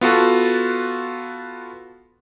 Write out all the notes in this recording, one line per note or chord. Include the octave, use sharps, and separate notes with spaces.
B3 F4 F#4 A4